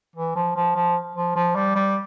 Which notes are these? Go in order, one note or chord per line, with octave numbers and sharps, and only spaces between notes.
E3
F3
F3
F3
F3
F3
G3
G3